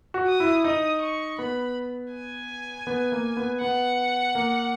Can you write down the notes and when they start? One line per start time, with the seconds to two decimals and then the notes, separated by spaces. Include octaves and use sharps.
0.14 F#4
0.27 D#6
0.40 E4
0.64 D#4 D#6
1.01 C#6
1.39 B3 B5
2.13 G#5
2.87 B3
3.12 A#3
3.37 B3
3.61 B3 F#5
4.35 A#3